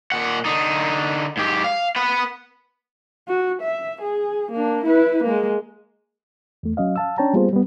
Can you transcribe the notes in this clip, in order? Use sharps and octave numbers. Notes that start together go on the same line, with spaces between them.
A#2 F#5
D3 D#4
G#2 G4
F5
B4 F#5
F#4
E5
G#4
A#3 D4
E4 B4
G#3 A#3
E2 A3
F#3 C#4 D#5 F5
F5 A5 E6
C#4 D4 C#5 G5 A5 A#5
G3 A#3 B3 F4 G#4 C5
G3 B3